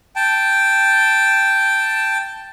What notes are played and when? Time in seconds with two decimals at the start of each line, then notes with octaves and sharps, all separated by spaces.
0.16 G5 A5